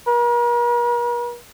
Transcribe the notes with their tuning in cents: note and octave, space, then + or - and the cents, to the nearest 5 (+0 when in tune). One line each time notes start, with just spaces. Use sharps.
A#4 +45